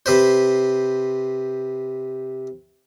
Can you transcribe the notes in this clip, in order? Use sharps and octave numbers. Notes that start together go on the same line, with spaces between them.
C3 B4 C5